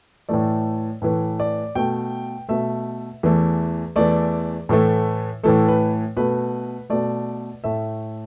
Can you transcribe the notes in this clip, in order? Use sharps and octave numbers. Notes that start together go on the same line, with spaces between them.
A2 E3 A3 D5
A2 E3 A3 B4
D5
B2 A3 G5
B2 A3 E5
E2 E3 A3
E2 E3 A3 D5
A2 E3 A3 A4
A2 E3 A3 A4
B4
B2 A3 B4
B2 A3 D5
A2 A3 E5